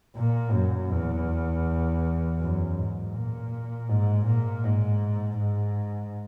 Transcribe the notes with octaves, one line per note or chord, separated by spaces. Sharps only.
A#2
F#2
E2
F#2
G#2
A#2
G#2
A#2
G#2
G#2